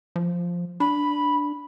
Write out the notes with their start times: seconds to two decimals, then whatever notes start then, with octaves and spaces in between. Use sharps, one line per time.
0.16 F3
0.80 D4 B5